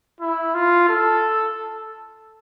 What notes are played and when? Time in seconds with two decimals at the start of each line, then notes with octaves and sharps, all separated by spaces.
0.21 E4
0.54 F4
0.89 A4